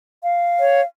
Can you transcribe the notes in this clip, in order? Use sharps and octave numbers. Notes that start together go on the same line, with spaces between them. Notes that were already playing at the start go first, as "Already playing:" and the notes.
F5
C#5